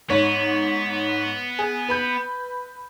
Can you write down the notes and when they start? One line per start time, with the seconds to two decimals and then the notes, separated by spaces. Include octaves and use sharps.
0.10 G#2 B3 C#5
1.59 G#4
1.89 B4 B5 G6